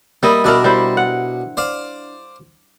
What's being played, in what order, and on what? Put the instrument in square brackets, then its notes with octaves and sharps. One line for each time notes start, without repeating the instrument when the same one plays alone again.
[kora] G3 E4 D#5 [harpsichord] A#3
[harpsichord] B2 D5 [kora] D4 E4 A#4
[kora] G3 E4 C5
F#5
[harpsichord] C5 D5 F5